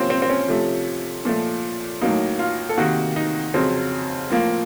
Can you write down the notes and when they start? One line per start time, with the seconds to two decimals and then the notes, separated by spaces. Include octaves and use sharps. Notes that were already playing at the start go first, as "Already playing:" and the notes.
Already playing: C3 F3 A#3 C4 C#4
0.10 C4
0.22 C4
0.30 C#4
0.48 C3 F3 A3
1.25 A#2 F3 A3
2.01 A2 F#3 A#3 D#4
2.39 F4
2.69 A4
2.77 C3 D#3 A#3 F#4
3.16 D#4
3.54 F2 C#3 F#3 C4
4.30 A2 F3 A#3